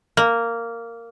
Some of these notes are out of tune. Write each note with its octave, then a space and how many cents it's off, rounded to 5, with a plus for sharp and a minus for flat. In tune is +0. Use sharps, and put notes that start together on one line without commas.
A#3 -10